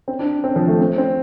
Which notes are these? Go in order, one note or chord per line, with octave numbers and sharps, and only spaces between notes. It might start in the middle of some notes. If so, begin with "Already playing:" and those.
C4
D4
C4
F3
A3
C4
C4